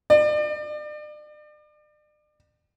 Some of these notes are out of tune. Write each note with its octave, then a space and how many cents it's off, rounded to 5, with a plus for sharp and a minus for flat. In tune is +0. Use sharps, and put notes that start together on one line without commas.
D5 +40